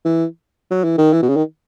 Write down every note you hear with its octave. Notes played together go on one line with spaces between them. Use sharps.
E3
F#3
E3
D#3
E3
B2
C#3
D#3